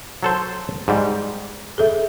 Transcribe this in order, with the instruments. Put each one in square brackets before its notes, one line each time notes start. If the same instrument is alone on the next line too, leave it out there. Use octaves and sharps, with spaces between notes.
[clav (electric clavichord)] F#3 A4 C5
G#2 G3
[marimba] G#4 A4 E5